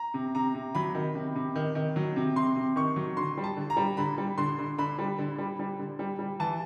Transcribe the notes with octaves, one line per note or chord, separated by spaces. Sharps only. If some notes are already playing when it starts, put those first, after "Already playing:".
Already playing: A#5
C3
C3 A#5
C3
F#3 B5
D#3
C3
C3
D#3
D#3
F#3
C3
C3 C6
C3
D#3 C#6
F#3
D3 C6
G3
A5
D3
A#5
G3
D3 B5
G3
D3 C6
D3
D3 B5
G3
D3
G3
G3
D3
G3
G3
E3 A5